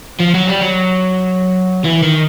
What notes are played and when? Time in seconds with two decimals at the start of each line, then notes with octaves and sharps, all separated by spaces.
0.20 F3
0.34 F#3
0.47 G3
0.61 F#3
1.84 E3
2.03 D#3